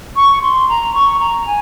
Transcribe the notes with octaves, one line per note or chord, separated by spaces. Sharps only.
C#6
C6
A#5
C#6
A#5
G#5